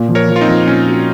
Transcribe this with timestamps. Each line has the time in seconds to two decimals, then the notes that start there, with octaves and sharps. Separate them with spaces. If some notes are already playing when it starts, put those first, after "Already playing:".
Already playing: A#2
0.08 F3
0.15 A#4 C#5
0.28 F3
0.36 F4
0.41 C4 D#4
0.48 F3
0.67 A#2 C#4
0.88 F#4